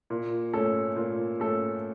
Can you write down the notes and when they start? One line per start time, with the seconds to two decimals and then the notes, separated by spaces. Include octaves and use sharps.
0.10 A#2
0.54 A3 C#4 A4
0.96 A#2
1.40 A3 C#4 A4